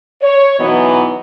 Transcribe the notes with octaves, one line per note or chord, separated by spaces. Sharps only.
C#5
B2 E3 F#3 B3 D#4 D#5